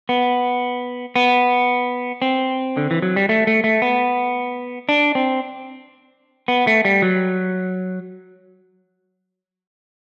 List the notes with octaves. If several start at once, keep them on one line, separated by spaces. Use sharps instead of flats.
B3
B3
C4
D3
E3
F#3
G3
A3
A3
A3
B3
D4
C4
B3
A3
G3
F#3